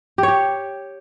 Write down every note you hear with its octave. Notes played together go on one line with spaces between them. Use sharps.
G4
C#5
G4